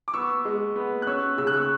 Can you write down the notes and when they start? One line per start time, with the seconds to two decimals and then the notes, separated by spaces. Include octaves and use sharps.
0.08 D6
0.14 B3 C#6 E6
0.45 G#3
0.76 B3
1.02 F#6
1.07 C#4 C#6 E6
1.38 C#3 E6
1.47 F#6
1.56 C#6 E6